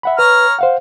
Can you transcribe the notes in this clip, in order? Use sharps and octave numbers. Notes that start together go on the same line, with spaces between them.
E5 F#5 B5
B4 C#5 A#5 F6
C5 F5 F#5